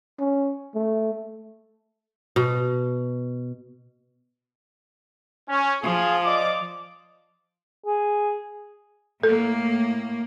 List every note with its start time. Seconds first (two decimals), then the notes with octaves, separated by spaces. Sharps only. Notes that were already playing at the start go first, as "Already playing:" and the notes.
0.19 C#4
0.75 A3
2.36 B2
5.49 C#4
5.83 F3 F4 G#4
6.25 D5 D#5 D6
7.86 G#4
9.23 A2 A#3 A4